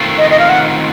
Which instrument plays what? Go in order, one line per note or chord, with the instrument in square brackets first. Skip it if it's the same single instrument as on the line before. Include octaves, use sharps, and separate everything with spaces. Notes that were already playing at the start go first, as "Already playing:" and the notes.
Already playing: [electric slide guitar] D#3 A3 C4 F4
[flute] D#5
D#5
F5
F#5